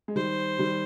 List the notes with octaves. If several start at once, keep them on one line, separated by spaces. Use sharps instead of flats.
G#3
D#3 G3 C5
D#3 G3